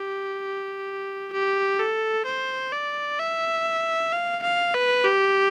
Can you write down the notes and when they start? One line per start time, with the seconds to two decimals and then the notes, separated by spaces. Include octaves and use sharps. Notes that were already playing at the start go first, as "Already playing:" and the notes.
Already playing: G4
1.33 G4
1.79 A4
2.26 C5
2.72 D5
3.19 E5
4.12 F5
4.43 F5
4.74 B4
5.04 G4